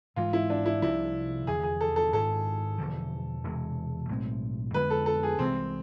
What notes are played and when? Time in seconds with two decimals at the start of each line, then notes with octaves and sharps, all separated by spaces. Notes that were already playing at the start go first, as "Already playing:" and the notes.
0.16 G#1 G#2 E3 G#3 F4
0.33 E4
0.50 D4
0.66 E4
0.82 C2 C3 F3 E4
1.47 F1 E2 D3 G#4
1.63 G#4
1.81 A4
1.96 A4
2.13 G#1 G#2 G#3 A4
2.78 E1 E2 D3 F3
3.44 E1 E2 C3 G#3
4.09 B1 A2 G#3 C4
4.74 F2 D3 G#3 B3 B4
4.90 A4
5.06 A4
5.23 G#4
5.39 C2 C3 E3 G#3 C4